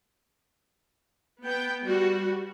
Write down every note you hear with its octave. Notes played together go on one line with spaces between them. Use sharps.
B3 G5
G3 F#4